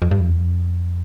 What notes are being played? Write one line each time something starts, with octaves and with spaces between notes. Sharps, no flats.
F2
G2
F2
E2
F2